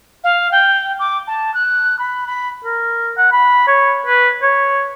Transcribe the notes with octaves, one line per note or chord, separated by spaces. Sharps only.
F5
G5
D6
A5
F#6
B5
B5
A#4
F#5
B5
C#5
B4
C#5